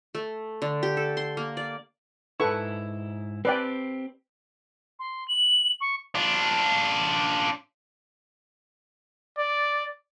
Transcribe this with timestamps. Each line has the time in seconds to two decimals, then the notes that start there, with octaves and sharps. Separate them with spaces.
0.15 A3
0.62 D3
0.83 G4
0.97 A4
1.17 C6
1.37 A#3
1.57 D5
2.40 G#2 E4 A4 B4 C#6
3.45 C4 G4 B4 D5 G5
4.99 C6
5.28 F#7
5.81 C#6
6.15 D4 F4
9.38 D5